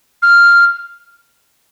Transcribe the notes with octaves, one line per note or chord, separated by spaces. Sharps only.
F6